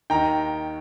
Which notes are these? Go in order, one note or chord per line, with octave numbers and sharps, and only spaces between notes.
D#2 D#3 G5 A#5